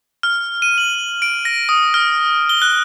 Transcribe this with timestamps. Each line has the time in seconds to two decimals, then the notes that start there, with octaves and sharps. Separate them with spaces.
0.23 F6
0.62 D#7
0.78 F#7
1.22 D7
1.45 A#6
1.69 D#6
1.94 F6
2.49 G7
2.62 F#6